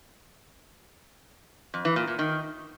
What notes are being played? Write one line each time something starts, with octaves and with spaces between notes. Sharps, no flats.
F2
E3
A#2
A#2
D#3